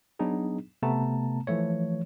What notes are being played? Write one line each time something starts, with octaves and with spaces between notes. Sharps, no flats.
F#3 B3 D4 D#4 G#4
C3 A3 B3 A5 A#5
E3 F3 A3 C#5